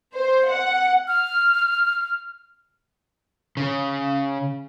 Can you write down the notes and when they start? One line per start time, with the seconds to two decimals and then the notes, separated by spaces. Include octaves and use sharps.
0.13 C5
0.49 F#5
1.07 F6
3.57 C#3